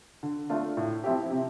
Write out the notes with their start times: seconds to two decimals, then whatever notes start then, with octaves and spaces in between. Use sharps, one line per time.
0.23 D3
0.50 A3 D4 F4
0.77 A2
1.04 F3 C4 E4 G4
1.30 C3